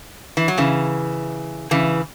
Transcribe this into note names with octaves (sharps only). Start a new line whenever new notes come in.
E3
F#3
C#3 E3
C#3 E3